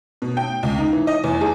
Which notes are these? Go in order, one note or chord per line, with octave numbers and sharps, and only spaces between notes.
B2
G5
C#2
D#4
E3
D#5
E2
G#4